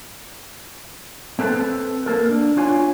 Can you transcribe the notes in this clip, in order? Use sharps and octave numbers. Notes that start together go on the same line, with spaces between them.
C4 A4 B4 A5
A#3 A4 A#4
D4
D4 F4 C#5 G#5